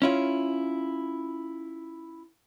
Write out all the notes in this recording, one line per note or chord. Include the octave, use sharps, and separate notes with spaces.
C#4 E4 F4